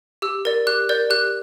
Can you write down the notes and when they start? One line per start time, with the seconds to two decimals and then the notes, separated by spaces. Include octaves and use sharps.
0.22 G4 E6
0.45 A#4 D5
0.67 G4 F#6
0.89 A#4 D5 G6
1.10 G4 F#6